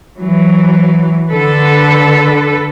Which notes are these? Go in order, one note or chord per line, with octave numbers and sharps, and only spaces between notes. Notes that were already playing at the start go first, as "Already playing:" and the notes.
E3 F#3
D3 A4 B4